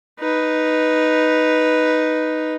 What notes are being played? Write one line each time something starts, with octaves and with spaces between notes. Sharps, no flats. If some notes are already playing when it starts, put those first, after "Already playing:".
D#4 B4